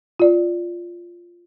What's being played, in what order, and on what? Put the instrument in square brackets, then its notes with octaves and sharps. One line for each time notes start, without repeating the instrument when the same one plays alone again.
[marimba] F4 D5